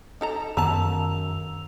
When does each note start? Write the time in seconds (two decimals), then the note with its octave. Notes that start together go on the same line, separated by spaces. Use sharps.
0.21 D#4 A4 A#5
0.57 F#2 D#3 B3 A5 A#5 E6 F7